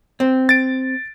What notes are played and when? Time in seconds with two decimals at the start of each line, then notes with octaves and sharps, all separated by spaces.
0.20 C4
0.49 A6 D7